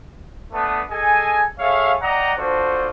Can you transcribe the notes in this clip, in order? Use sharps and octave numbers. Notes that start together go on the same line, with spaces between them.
A3 B3 D4 B4 A5 D#6
G#4 A4 D#5 G#5
G#4 A4 C#5 E5 F5
D5 D#5 F#5 G5 A#5
D4 F4 F#4 A4 C5